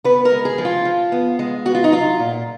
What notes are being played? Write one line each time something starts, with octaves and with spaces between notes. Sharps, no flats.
B3 B4
A#4
G#3
G#4
F3
F4
F3
B3
G#3
B3 F#4
F4
D#4
F#3 F4
A#2